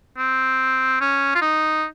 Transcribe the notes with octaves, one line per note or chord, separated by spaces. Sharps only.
C4
C#4
F4
D#4